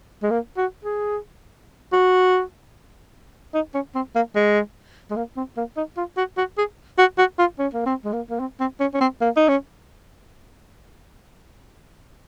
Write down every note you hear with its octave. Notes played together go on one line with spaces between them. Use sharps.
G#3
A#3
F#4
G#4
F#4
D#4
C#4
C4
A#3
G#3
G#3
A#3
C4
A#3
D#4
F4
F#4
F#4
G#4
F#4
F#4
F4
C#4
A#3
C4
G#3
A#3
A#3
C4
C4
C#4
C#4
C4
A#3
D#4
C#4